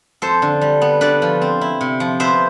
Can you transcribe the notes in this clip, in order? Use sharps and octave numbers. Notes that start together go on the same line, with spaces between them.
F2 A4 C5
D3
G3
B3
D3 B4 D5
F3
C4
E4
C3
F3
B3 C5 E5